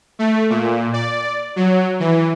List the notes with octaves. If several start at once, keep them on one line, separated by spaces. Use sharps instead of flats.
A3
A#2
D5
F#3
E3